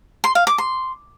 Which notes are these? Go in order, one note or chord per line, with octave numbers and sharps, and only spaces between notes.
C6
F5
D6
C6